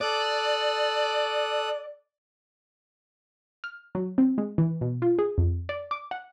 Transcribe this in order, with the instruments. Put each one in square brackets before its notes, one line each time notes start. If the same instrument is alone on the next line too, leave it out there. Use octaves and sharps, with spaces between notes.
[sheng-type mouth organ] A4 D#6 F#6 [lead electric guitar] D5
[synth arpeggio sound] F6
F#3
C4
G#3
E3
B2
F4
G#4
F2
D5
D6
F#5